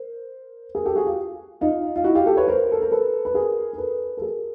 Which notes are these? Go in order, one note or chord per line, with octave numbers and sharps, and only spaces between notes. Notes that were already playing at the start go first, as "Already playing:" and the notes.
Already playing: A#4 C5
G#4 A#4
G4 A4
F#4 G#4
F4 G4
D#4 F4
F4
E4 F#4
F4 G4
G4 A4
B4 C#5
A#4 C5
A4
A#4
A4 B4
B4
G#4 A#4
A#4
A4 B4
A4
G#4 A#4